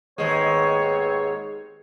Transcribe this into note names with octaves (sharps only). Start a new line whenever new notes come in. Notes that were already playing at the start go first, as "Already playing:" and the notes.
D#2 G#2 G#3 B3 C4 C#5